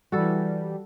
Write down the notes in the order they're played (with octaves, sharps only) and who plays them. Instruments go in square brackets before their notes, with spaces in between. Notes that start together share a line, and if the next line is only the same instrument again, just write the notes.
[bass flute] E3 [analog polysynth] G3 [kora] F#4 A4